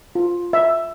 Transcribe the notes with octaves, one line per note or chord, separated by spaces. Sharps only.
F4
E5